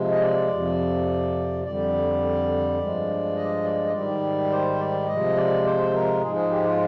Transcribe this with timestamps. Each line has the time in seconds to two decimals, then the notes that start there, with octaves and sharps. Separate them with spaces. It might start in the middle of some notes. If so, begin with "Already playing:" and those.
Already playing: C3 F3 G#3
0.10 D#5
0.21 D5
0.50 F2 C3 F3
1.65 F2 D3 G3 D5
2.78 G2 F3 G#3
3.36 D#5
3.64 D5
3.84 D#5
3.92 G#2 D#3 G3 D5
4.50 C5
4.78 D5
5.07 C3 F3 G#3 D#5
5.36 D5
5.63 C5
5.92 A#4
6.21 G#2 F3 G#3 G#4
6.35 G#4
6.49 G4
6.64 F4